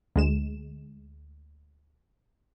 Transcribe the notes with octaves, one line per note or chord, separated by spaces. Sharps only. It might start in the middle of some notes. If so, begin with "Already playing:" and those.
D2 G#3 E7